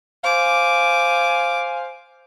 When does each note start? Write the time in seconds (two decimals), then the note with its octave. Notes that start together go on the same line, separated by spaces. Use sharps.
0.24 C5 F5 G#5 D6